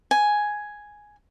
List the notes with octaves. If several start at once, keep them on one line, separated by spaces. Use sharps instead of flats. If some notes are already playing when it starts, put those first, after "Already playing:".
G#5